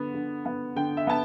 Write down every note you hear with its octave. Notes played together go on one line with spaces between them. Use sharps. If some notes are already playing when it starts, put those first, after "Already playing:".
Already playing: D3 B3
D3
B3
D3 G5
E5
B3 A5